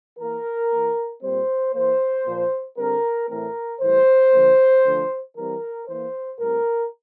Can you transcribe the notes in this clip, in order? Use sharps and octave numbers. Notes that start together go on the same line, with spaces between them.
E3 A#3 A#4
E3 A#3
A#2 G3 C4 C5
E3 A#3 C5
A#2 F3 A#3
D3 G3 C4 A#4
A2 E3 A3 C4 A#4
A2 E3 G3 C5
D3 F3 A#3
D3 F3 A3
E3 G3 C4 A#4
E3 A#3 C5
A2 G3 C4 A#4